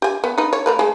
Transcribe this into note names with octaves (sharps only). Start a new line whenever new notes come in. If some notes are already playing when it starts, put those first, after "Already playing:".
G4 G#5
B3
D#4 B4
C#5
A3 A#4 B4
G#3 A3